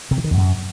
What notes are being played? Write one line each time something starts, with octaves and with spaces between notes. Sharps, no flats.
C3
E3
D#3
E2
F#2